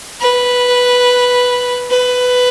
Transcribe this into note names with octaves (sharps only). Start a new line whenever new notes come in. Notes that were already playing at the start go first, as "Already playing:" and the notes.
B4
B4